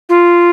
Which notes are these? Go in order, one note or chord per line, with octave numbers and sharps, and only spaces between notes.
F4